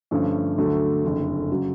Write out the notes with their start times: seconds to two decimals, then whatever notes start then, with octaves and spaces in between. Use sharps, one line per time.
0.11 G2 D3 F3 A3 C#4
0.57 D2 D3 F#3 A3
1.04 F#1 F2 D3
1.51 C#3 F#3